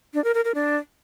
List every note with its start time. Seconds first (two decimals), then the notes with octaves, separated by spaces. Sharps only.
0.14 D4
0.24 A#4
0.34 A#4
0.45 A#4
0.55 D4